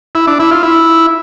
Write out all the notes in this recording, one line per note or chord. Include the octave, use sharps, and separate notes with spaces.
E4
D4
E4
F4
E4